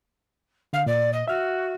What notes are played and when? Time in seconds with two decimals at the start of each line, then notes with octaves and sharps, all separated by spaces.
0.73 D3 F5
0.86 A#2 D5
1.12 D#5
1.28 F#4 E5 F6